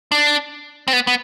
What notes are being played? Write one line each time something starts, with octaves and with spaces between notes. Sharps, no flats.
D4
C4
B3
B3